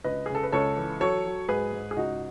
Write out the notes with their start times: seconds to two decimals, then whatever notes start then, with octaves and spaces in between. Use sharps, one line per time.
0.04 C#2 B4 D#5
0.26 C#3 G#4
0.35 A4
0.43 B4
0.52 C#2 A4 C#5
0.77 E3
1.00 F#3 A4 C#5
1.25 F#3
1.48 G#2 G#4 B4
1.73 G#2
1.91 G#4
1.97 C#2 D#4 F#4